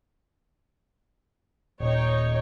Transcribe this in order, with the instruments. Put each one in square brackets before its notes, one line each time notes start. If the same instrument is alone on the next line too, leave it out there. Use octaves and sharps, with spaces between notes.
[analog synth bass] D#1 [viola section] D#4 C#5 G5